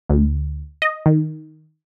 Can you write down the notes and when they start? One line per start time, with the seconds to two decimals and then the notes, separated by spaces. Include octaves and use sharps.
0.10 D2
0.82 D#5
1.06 D#3